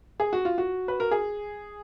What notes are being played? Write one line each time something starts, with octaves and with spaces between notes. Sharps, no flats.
G#4
F#4
F4
F#4
B4
A#4
G#4